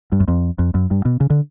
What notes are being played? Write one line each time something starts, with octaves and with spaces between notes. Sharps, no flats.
G2
F#2
F2
F2
F#2
G2
B2
C#3
D3